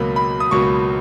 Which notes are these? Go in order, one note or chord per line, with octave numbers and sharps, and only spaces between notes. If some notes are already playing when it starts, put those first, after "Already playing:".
Already playing: C#2 B2 F#3 A#3 B5
B5
D#6
C#2 B2 F#3 A#3 C#6